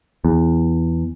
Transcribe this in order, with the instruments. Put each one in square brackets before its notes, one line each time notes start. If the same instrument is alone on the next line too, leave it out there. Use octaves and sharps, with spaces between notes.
[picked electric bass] E2